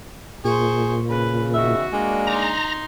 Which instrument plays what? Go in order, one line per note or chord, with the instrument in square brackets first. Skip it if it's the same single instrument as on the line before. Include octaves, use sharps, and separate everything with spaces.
[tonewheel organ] A#2 [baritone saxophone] G#4 [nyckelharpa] C5 C#6
[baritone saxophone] C#3 [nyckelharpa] B4
[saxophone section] E2 D#3 E5 [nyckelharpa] F#4
[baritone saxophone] G#3 [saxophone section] A#3 D4
[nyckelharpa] D#4 C6 [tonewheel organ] A#5